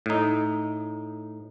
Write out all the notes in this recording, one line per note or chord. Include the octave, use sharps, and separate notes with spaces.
A2 D#4